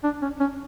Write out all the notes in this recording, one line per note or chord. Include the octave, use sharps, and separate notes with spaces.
D4
C#4
C#4